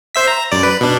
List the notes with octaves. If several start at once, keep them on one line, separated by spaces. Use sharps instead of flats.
C5 E5 B6
A#5
F#2 D5
B4
B2 D4